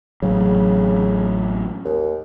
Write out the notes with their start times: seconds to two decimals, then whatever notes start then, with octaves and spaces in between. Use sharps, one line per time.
0.22 A1 C#3 F#3
1.85 D#2